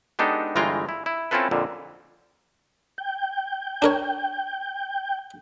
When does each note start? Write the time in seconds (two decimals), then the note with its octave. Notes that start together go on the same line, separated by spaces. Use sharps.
0.19 G#3 B3 D4 D#4 G4 A4
0.55 G1 E3 G#3 F4 G5 A#5
0.89 E4
1.06 E4
1.31 C4 C#4 E4 F4 A4 B4
1.51 F2 A#2 D3
2.98 G5
3.82 D4 A#4 C#5